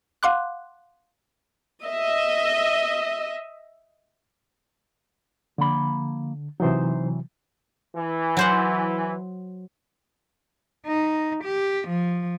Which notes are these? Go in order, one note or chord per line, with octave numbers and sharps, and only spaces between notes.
F5 F#5 C6 D6 F#6
D#5 E5
D3 F3 A#3 B5
C3 E3 F#3 D#4 C5
E3
F#3 C5 F#5
D#4
G4
F3